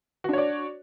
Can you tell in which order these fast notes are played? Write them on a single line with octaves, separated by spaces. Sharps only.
F#4 D4 C#5 D5